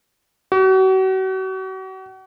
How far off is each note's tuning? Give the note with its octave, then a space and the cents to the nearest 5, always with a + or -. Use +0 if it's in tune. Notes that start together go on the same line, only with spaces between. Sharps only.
F#4 +40